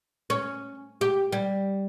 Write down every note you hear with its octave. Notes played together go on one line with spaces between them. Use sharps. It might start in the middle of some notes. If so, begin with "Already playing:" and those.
C#4
G4
G3